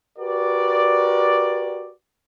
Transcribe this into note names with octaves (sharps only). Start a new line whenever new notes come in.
F#4 G4 A#4 B4 D5